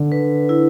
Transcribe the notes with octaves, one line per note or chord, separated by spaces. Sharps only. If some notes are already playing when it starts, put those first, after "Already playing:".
Already playing: D3
B4
E4